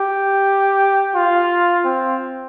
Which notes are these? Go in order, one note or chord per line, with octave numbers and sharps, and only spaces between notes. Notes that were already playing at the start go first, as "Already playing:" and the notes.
Already playing: G4
F4
C4